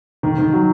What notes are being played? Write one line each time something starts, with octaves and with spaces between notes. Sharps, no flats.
D#3
D#3
F#3